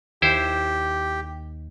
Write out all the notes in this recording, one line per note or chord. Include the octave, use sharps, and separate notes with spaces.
D#2 E4 G4 C5